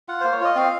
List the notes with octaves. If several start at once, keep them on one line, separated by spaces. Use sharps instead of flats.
F4 F#5
A#3 C5
C#5
F4 D#5
C4 F5